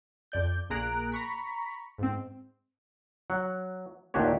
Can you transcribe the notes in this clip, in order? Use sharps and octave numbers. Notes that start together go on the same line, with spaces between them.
F2 D5 G6
A#1 A#3 G#4 A#5 F#6 D7
A#5 B5 C#6 B6
G#2 C4
F#3 F#5
D#2 A#2 D4 F#4 G4 C#5